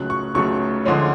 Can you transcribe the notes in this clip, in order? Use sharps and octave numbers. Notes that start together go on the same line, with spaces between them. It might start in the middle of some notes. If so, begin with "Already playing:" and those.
Already playing: C#2 C#3 F#3 A3 F#6
C#6
C#2 C#3 F#3 A3 C#6
D2 D3 F3 G#3 C#4